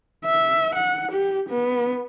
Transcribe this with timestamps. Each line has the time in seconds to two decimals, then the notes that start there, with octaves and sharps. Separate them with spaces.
0.25 E5
0.76 F#5
1.12 G4
1.49 B3